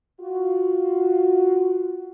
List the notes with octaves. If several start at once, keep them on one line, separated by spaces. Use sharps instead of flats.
F4 F#4